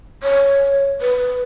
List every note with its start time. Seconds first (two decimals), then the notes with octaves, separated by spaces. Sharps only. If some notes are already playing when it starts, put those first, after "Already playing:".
0.23 C#5
1.01 B4